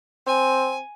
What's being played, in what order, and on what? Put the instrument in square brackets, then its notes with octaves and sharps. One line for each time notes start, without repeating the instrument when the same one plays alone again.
[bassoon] C4 [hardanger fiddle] G#5